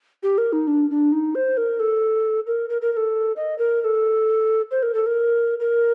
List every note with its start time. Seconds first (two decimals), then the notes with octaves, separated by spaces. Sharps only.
0.23 G4
0.38 A#4
0.52 D#4
0.67 D4
0.90 D4
1.12 D#4
1.35 C5
1.57 A#4
1.80 A4
2.47 A#4
2.69 A#4
2.82 A#4
2.92 A#4
2.97 A4
3.36 D#5
3.58 A#4
3.81 A#4
3.84 A4
4.71 C5
4.82 A#4
4.94 A4
5.06 A#4
5.60 A#4